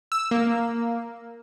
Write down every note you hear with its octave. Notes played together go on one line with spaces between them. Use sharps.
E6
A#3